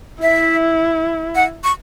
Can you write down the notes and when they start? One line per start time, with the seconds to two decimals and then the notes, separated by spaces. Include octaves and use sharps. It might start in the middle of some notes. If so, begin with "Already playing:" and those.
0.22 E4 E5
1.35 F#5
1.64 C#6